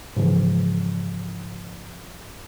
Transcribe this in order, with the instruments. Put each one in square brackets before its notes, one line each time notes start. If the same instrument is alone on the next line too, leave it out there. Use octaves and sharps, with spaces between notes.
[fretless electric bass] G#2 C#3 E3 F3